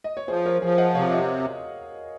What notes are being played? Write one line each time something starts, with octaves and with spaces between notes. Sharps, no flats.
D#5
C#5
F3 G#4 C5
A#4 C#5
F3 G#4
D#5 F#5
C3 C#5 F5
D#5 F#5